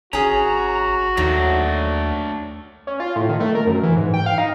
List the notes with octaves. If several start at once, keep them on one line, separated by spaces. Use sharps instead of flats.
G#1 C#4 F#4 G#4 A#5
D#2 D#3 F#3 A3 D4 C#5
C#4
F4
A2
D#3
A3
A#4
F#2
E3
G#2
G5
F5
D#4